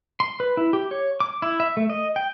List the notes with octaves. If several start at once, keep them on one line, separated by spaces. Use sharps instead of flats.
C6
B4
E4
G4
C#5
D6
E4
E5
A3
D#5
G5